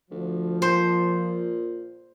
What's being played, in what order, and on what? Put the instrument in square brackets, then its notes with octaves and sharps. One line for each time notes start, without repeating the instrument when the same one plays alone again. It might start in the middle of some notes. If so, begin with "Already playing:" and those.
[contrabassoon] D2 [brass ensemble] F3
[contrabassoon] A#2 [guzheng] C5